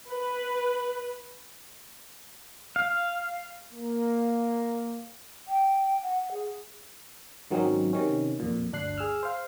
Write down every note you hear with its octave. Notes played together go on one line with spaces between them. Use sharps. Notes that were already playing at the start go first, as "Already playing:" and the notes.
B4
F5
A#3
G5
F#5
G#4
G#2 D#3 F#3 C4 C#4 D#4
C3 D#3 C#4
F2 A#2
G1 D2 D4 F#6 C7
G#4 E6 F6
C5 F5